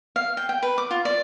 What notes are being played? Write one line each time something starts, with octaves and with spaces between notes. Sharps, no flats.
F5
G5
G5
B4
D6
F4
D5